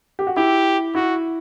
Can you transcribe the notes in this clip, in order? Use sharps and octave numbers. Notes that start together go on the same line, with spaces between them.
G4
F#4
E4 G4
E4 F#4